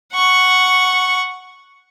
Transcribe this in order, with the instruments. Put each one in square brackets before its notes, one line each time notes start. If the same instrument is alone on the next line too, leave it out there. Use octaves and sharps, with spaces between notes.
[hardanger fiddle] F#5 C#6